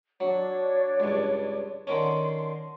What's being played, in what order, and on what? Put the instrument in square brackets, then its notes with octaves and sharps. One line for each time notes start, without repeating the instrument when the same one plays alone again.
[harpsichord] F#3 [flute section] D4 C#5
[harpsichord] C#2 G2
[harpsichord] D3 D#3 C#4 [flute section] C6